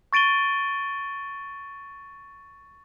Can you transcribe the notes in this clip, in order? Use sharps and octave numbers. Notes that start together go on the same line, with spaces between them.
C#6 A6 D7 D#7 G7